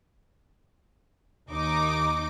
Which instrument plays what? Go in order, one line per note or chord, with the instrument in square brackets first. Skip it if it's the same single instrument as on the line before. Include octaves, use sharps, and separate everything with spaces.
[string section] D#2 D#4 D6